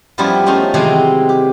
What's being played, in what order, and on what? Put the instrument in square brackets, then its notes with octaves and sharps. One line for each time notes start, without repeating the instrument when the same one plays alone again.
[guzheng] F#2 F3 G3 B3 E4 F4
F3 A3 C#4 D#4 F4
C3 D#3 E3 F#3 G#3 C4
G4